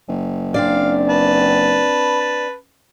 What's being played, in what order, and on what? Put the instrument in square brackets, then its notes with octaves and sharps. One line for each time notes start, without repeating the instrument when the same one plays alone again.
[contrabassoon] F#1
[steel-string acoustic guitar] C4 D4 D5 [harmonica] F5
[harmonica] B4 A5